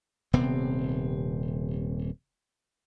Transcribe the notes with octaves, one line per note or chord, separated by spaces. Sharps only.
D#1 C3 B3 C4